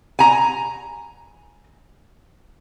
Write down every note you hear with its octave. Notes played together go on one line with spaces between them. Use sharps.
G#5 A#5